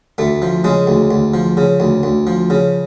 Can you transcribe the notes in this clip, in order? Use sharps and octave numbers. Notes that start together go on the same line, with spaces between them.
D2 A3
F3
C#3 G#3
D2
D2
F3
C#3
D2
D2
F3
C#3